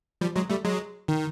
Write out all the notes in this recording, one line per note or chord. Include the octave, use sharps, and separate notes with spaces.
F3 G3
F#3 G#3
G3 A3
F#3 G#3
D#3